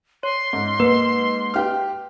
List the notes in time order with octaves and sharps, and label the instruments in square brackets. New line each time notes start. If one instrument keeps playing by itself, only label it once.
[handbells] C#5 [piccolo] C6
[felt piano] G#2
[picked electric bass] A#3 [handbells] B4
[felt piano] G4 F6